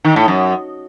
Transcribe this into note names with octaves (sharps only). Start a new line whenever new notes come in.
D#3
A2
F#2